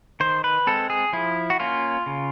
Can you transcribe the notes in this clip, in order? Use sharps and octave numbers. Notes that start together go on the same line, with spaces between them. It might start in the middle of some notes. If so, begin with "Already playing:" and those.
D#3 C5
B4
G#3 C4 A4
G#4
F3 E4
F#4
A#3 C#4 F4
C#3